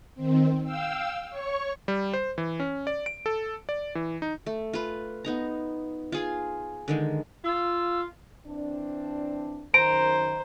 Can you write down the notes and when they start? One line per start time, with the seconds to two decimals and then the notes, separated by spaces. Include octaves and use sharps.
0.15 D#3 C4
0.63 F5 G5 E6
1.30 C#5 C#6
1.88 G3
2.13 C5
2.38 E3
2.60 C#4
2.87 D5
3.06 D7
3.26 A4
3.69 D5
3.95 E3
4.22 D#4
4.46 A3
4.73 F4 B4
5.25 B3 D#4 A#5
6.12 F4 G#4 G#5
6.88 D3 D#3 G#3
7.45 F4 E6
8.47 E3 C4 D4
9.74 F#2 D#3 C5 A#5 D7